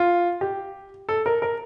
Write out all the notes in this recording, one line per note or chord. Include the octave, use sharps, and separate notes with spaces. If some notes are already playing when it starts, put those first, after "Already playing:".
Already playing: F4
G4
A4
A#4
A#4